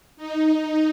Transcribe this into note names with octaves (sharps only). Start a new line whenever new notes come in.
D#4